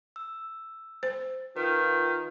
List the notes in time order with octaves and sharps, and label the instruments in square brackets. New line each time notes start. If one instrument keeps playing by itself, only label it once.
[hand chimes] E6
[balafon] C5
[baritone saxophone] D#3 [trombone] F4 [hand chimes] B4